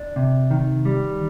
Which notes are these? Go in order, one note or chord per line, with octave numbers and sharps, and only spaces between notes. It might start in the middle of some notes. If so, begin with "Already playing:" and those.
Already playing: D4
C3
D#3
G3